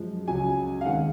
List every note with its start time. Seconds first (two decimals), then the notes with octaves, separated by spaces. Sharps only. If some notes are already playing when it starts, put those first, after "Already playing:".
Already playing: F#2 F3 G#3
0.28 C#2 C#3 F#3 G#5
0.81 F5
0.85 D#2 D#3 G#3 C4 F#5